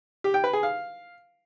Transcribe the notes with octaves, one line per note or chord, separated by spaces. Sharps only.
G4
G5
B4
G#4
F5